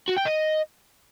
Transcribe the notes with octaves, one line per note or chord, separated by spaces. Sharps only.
F#4
G5
D#5